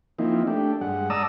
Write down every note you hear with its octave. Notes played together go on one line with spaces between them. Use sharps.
F3 A#3 C4 D#4 E4
A3 D4 G4
G2 G#3 F#5
D5 A5 A#5 D#6 E6